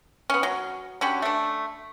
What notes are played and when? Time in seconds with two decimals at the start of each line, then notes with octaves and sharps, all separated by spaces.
0.30 B3 C#4
0.43 F#3
1.01 D3 C#4 F#4 G4
1.22 A3 D4